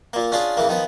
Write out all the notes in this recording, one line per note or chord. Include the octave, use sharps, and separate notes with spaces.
A#2 A#3
C#4 D4 F4 G#4
C#3 E3 A#3
D#3 F3 B3